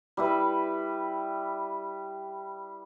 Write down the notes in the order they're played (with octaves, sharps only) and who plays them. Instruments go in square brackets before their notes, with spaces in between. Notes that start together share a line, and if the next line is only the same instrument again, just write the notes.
[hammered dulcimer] G3 E4 B4